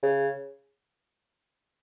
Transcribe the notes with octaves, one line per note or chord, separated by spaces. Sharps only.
C#3